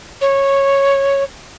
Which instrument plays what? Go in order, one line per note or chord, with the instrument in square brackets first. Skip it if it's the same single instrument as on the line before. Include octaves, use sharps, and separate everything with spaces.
[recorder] C#5